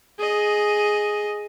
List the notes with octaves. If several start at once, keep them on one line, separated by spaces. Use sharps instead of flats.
G#4 D#5